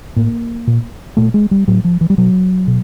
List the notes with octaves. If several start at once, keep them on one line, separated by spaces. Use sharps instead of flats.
A2 A#3
A#2
A#2 A3
G#3
G3
A2 F#3
F3
E3
G3
B2 F#3
B2